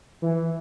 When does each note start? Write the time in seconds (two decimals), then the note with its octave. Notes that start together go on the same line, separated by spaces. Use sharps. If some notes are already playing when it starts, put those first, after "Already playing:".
0.22 E3